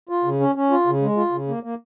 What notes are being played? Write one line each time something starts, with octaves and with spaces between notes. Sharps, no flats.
F4
C#3
C#4
C#4
F4
C#3
G#3
F4
C#3
A#3
A#3